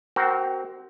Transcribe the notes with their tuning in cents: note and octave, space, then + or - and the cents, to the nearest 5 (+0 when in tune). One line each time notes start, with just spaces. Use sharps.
C4 -5 F#4 +25 A#4 +0